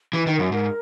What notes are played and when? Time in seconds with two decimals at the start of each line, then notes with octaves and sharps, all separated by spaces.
0.13 E3 B4
0.27 D#3
0.33 A#4
0.39 F#2
0.52 G#2 A#4